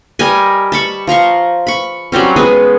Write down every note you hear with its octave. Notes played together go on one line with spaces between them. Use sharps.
G3 A#4 D#5 G#5
A5 B5 C#6
F3 A#5 C6 C#6
B5 C#6
F#3 G3 C4 C#4
G#3 B3 G#4